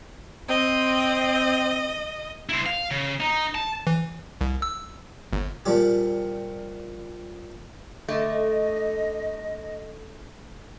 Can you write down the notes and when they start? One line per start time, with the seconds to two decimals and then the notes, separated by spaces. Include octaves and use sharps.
0.49 C4 D#5
2.49 E4 C5
2.66 F5
2.91 C#3
3.21 D#4
3.55 A5
3.87 E3
4.41 C2
4.62 E6
5.33 G1
5.66 A#2 F3 G3 G4
8.08 D3 A3 D#5